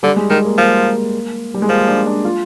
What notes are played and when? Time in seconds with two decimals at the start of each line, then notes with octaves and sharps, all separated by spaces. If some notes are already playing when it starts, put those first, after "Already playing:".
0.03 D3 G3
0.16 G#3
0.30 D#3 G#3
0.44 A#3
0.58 F3 A#3
1.54 G3
1.62 G#3
1.69 F3 A#3
1.87 D4
2.06 D4
2.25 F4